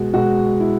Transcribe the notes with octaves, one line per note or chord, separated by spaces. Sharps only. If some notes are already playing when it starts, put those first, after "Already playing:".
Already playing: B2 G#3 F#4
B2 G#3 F#4
E4